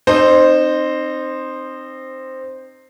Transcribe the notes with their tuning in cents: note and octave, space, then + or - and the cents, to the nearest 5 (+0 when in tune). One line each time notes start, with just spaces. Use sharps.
C4 +10 D#4 -25 C5 +0